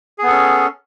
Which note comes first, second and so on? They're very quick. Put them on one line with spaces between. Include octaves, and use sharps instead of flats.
G#4 B3 A4 C#4